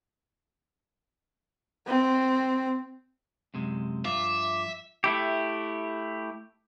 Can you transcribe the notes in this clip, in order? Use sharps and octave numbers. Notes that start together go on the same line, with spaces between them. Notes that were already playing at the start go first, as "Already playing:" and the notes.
C4
F#2 C3 G#3
G2 F3 F4 E5 D6
A3 E4 G4